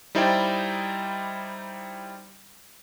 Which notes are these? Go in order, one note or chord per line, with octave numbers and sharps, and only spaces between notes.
G3 D#4 E4 C5 D5 G5